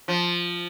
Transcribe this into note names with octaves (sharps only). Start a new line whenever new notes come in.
F3